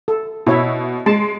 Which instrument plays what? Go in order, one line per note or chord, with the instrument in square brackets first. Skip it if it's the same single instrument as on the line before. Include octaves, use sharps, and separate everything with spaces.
[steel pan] A4
[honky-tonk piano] B2 [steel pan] E4 C#5 E5
[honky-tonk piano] G#3 [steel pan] A5